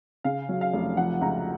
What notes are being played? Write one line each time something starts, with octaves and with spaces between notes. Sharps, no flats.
C#3 F5
F#3
F5
F1
F3 F#5
C#2 A#5